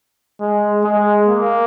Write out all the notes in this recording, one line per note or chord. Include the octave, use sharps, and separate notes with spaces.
G#3
G#3
A#3